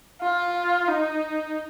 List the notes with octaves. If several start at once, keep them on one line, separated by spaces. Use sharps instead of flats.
F4
D#4